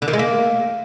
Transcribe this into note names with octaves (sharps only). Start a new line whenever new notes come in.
D3
D#3
G#3
A#3